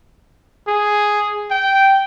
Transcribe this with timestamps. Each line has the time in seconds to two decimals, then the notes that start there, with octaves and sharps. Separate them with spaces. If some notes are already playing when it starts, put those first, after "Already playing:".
0.67 G#4
1.51 G5